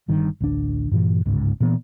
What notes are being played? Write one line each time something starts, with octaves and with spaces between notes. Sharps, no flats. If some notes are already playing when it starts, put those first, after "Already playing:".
G1 G2 D#3
A1 D2 D4
G2 A#2 E3
G1 C#2 G#2 C#3
A#2 E3 B3